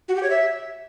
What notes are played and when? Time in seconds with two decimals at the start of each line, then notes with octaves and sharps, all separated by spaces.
0.08 F#4
0.16 G4
0.23 C#5
0.30 E5